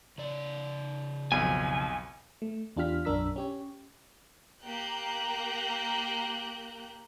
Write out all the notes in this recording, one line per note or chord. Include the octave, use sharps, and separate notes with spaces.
C#3 D5
B1 F2 G#5
A3
E2 D4 F4 G4 F6 B6
B1 F#2 D4 A#4 E6 B6
C#4 G4 C#5
A#3 G4 A#5 F#6 G6